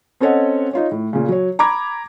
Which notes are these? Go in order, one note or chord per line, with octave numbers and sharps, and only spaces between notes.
C4 C#4 A4 C#5 D#5 F#5
D#4 F4 C#5
A2
A#2 C#3
F#3 C#5
A#5 B5 D6 G#6